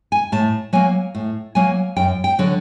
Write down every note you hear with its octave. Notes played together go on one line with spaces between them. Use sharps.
G#5
A2 A5
F#3 A#3 G#5
A2
F#3 A#3 G#5
F#2 G5
G5
D3 F#3